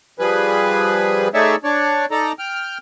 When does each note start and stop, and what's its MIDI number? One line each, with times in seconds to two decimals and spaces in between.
0.19 1.28 53
0.19 1.28 55
0.19 1.28 68
0.19 1.28 71
1.34 1.56 57
1.34 1.56 63
1.34 1.56 68
1.34 1.56 73
1.34 1.56 74
1.34 1.56 76
1.64 2.06 62
1.64 2.06 73
1.64 2.06 74
2.11 2.32 63
2.11 2.32 69
2.11 2.32 74
2.11 2.32 82
2.39 2.78 79
2.39 2.78 89